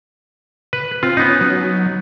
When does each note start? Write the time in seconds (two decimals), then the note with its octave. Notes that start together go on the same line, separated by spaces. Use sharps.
0.73 B4
1.03 C4 F4
1.17 B3 C#4 D#4
1.41 F#3